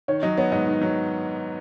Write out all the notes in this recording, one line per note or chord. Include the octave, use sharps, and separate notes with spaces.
D#3 C#5
F#3 D#5
B3 C#5
G#2 D#5
D#3
F#3